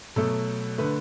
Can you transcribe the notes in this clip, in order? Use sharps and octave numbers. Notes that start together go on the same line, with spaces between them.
B2 F#3 A3 A4
D3 A3 B4